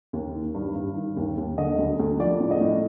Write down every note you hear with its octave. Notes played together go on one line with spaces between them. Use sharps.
D#2
D#3
G2
G2
D#3
D#2
D#2
D3 D#5
D2
D2
F3 D5
A2
D#5
A2